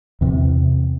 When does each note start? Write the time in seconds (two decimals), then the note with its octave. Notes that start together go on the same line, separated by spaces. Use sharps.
0.21 E2 C3